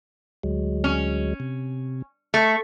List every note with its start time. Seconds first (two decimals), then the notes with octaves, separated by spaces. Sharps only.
0.43 D2 F#3 G#3
0.84 C#4
1.40 C3
2.34 A3 C#6